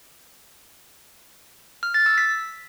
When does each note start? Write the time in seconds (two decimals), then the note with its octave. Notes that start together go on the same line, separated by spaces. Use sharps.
1.83 F6
1.94 A6
2.06 E6
2.18 B6